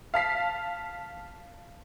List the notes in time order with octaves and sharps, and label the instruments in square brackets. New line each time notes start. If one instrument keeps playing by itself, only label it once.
[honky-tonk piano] F5 A5 B6 C7